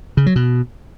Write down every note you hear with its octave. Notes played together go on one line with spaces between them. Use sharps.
C#3
F#3
B2